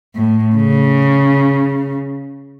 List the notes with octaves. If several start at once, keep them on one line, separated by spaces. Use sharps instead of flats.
A2
C#3